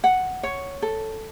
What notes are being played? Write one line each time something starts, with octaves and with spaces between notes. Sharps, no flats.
F#5
C#5
A4